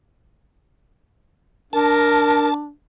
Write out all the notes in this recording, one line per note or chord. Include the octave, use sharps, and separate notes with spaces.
D4 A#4 A5